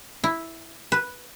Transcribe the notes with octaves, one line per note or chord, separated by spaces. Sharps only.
E4
B4